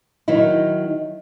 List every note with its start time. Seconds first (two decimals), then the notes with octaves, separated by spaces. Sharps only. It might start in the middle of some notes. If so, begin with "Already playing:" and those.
0.28 D#3 F#3 D#4 E4